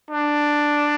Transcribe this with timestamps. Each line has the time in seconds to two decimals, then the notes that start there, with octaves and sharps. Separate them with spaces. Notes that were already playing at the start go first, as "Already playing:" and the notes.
0.11 D4